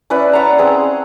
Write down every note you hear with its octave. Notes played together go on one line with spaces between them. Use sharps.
C#4 E4 B4 D5
C#5 F#5 A5 A#5
C4 G#4 C6